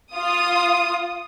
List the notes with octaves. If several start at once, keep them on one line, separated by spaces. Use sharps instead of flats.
F4 D#6